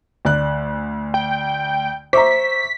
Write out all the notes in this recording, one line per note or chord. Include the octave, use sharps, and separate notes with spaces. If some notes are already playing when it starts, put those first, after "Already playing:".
D2 D5 F#6
G5
C5 E5 A#5 C#6 D6 B6